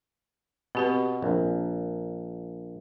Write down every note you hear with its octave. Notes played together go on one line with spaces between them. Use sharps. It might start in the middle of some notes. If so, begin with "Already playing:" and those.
B2 C4 G4 B4
A#1